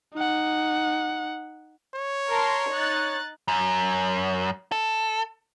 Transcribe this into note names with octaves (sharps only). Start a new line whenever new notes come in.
D#4 F#5
C#5
A#4 A5 C6
D#4 F#6 A6
F#2
A4